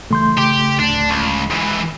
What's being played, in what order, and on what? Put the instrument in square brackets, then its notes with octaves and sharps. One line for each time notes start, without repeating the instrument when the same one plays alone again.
[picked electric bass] C#3 E3 G3 [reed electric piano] A3 C6 G6
[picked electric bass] C#3 [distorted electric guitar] G4
[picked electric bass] D1 [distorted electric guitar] D4
[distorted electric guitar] C#2
G#2 E3